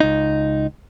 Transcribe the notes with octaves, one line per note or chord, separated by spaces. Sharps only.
C#2 D#4